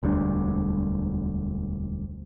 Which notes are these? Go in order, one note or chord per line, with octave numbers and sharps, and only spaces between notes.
E1 D2 G3 D4